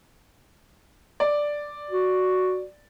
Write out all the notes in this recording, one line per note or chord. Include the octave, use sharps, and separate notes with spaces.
D5
F#4